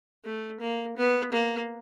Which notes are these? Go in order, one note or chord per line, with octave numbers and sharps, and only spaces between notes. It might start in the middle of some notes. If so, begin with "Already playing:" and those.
A3
A#3
B3
A#3